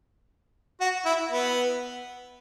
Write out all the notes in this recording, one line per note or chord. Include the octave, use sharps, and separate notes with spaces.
F#4
E4
B3